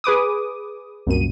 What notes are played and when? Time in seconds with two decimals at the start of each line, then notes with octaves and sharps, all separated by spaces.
0.04 G#4 B4 D6 D#6
1.07 C2 F#2 A#2 D#7